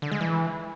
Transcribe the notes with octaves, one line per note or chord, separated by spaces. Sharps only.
D3
G#3
E3